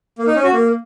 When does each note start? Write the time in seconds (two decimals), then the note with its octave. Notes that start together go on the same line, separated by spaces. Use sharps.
0.18 A#3
0.27 D#4
0.36 C#4
0.44 F#4
0.53 A#3